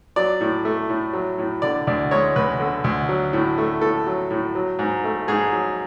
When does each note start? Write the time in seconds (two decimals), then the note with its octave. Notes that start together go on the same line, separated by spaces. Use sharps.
0.16 F#3 D5
0.41 A2
0.65 A3
0.89 A2
1.13 F#3
1.38 A2
1.62 D3 D5
1.87 D2 D5
2.11 G#3 C#5
2.36 D2 B4
2.60 D3
2.84 D2
3.09 F#3
3.33 A2
3.58 A3
3.81 A2 A4
4.06 F#3
4.31 A2
4.55 F#3
4.79 G#2
5.04 A3
5.28 G#2 G#4
5.52 F#3